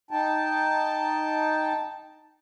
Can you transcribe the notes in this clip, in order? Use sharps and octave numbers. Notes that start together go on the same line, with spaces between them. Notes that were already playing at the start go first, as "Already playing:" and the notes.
D#4 G5 A5